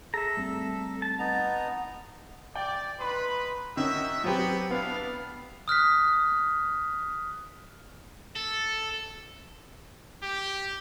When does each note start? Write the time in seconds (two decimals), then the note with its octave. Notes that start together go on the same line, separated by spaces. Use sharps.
0.14 G#4 A4 E5 A#5
0.37 G3 A3 C4
1.02 A5
1.19 B3 D#4 A#5
2.55 D5 G5
3.00 D#4 B4 C6
3.77 D#3 C#4 F#4 D#5 E5
4.24 F#3 B3 C4 G4
4.71 B3 D4 E4 F5
5.68 D#6 F6 F#6 B6
8.36 A4
10.23 G4